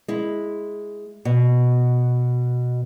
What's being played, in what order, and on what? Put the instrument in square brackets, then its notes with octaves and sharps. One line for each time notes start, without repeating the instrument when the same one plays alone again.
[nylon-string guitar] G#3 E4
B2